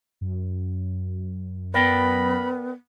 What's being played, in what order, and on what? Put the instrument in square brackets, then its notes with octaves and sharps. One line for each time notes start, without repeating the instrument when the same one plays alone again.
[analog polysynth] F#2
[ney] B3 [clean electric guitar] A#4 D5 G5 [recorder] B5